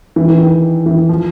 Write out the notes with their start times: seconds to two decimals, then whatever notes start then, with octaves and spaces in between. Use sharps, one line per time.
0.16 E3
0.29 E3
0.39 D#3
0.86 E3
1.09 F3